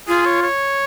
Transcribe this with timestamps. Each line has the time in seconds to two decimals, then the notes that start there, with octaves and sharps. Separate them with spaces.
0.08 F4 G#4
0.26 C#5
0.42 C#5